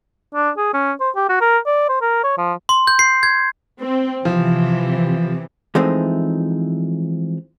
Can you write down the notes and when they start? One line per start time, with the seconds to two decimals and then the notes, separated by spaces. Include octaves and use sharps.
0.35 D4
0.57 G#4
0.73 C#4
1.00 C5
1.16 G4
1.29 F#4
1.41 A#4
1.66 D5
1.89 C5
2.01 A#4
2.24 C#5
2.38 F3
2.69 C6
2.87 G6
2.99 C7
3.23 G#6
3.79 C4
4.25 C3 E3 F3
5.75 E3 F3 G#3 A3 C4 D#4